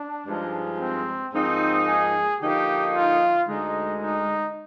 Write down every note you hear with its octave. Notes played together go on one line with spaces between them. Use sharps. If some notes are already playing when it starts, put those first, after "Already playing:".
Already playing: D4
G2 F3 G#3 D#4
C4
G#2 F3 A#3 C4 D#4
G#4
D3 F3 A#3 D#4 G4
F4
D2 D3 G#3 D#4
D#4